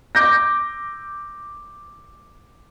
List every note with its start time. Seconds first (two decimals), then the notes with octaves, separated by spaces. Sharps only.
0.15 D6 G6 A#6